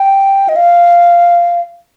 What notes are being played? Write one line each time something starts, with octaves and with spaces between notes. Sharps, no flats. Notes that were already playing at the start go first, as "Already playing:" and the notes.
Already playing: G5
D#5
F5